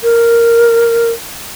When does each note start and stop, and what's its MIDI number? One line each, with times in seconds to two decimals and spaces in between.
0.03 1.09 70